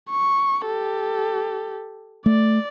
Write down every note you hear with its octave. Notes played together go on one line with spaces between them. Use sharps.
C#6
G4 A4
A3 D5